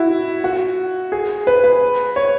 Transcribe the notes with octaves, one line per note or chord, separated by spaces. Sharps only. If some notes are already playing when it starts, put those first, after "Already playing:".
Already playing: E4 F#4
F#4
G#4
B4
B4
C#5